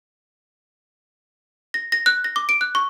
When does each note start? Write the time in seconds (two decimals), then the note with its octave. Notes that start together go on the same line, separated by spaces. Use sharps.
1.74 A#6
1.92 A#6
2.06 F#6
2.24 A#6
2.36 D6
2.49 D7
2.61 F#6
2.75 C#6